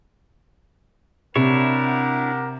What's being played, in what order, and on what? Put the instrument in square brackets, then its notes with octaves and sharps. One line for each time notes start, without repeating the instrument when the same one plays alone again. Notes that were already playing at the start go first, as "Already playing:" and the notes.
[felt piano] C3 [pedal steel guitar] D4 E4 C#5 [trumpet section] G4 A#4 F#5